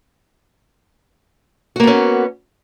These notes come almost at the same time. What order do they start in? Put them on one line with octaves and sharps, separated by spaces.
F#4 A#3 B3 C#4